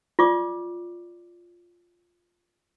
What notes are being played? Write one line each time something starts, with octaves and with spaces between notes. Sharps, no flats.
F4 D5 C#6 D6